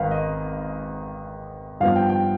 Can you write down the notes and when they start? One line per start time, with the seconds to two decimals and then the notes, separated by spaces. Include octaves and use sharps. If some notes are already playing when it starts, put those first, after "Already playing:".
Already playing: G#1 G#2 D#3 B4 F5
0.11 D#5
1.80 G2 F3 B3 F5
1.96 G5
2.09 G5